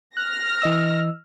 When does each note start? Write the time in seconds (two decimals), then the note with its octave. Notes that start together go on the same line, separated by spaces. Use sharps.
0.17 F6 F#6 A#6
0.62 E3 D#5 E6